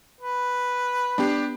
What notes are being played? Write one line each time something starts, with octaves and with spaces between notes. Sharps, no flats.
B4
B3 D4 G4 C7